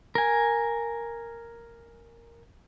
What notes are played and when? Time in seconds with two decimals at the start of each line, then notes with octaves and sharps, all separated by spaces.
0.15 A#4 G#5